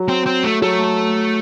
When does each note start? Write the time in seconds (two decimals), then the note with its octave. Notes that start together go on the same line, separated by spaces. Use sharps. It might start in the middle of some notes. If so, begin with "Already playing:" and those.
Already playing: F#3
0.09 C4
0.27 C4
0.44 A3
0.62 F#3 A3